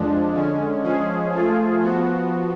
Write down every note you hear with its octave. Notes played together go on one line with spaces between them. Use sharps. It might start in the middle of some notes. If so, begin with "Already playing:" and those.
Already playing: F2 F3 G#3 D4
D3 G#3 C#4
F3 G#3 C#4 G#4
F3 A3 F4 G#4
F3 B3 F#4